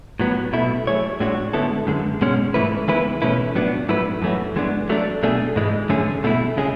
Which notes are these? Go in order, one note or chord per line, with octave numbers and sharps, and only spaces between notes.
A2 F#3 B3
B2 A3 E4
F#3 A3 E4 G#4 C#5
A2 G#3 D4 F#4 C#5
D3 G#3 B3 E4 A4
F#2 D3 G#3
B2 G#3 C#4
G#2 E3 A3 E4 B4
E3 G#3 B3 E4 B4
B2 A3 C#4 E4 B4
A2 F#3 B3 D4
A2 F#3 A3 E4 B4
F#2 E3 A3 C#4 F#4
E3 G#3 B3 D4
F#3 A3 D4
B2 A3 D4 G#4
G#2 E3 G#3
F#2 D3 A3 C#4 G#4
B2 A3 E4
C#3 G#3 C#4 G#4